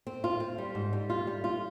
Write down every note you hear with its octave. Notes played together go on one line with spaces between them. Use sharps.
C4
F4
C4
G3
G#2
G3
F4
G3
F4